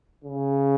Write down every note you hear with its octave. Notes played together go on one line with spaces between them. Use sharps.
C#3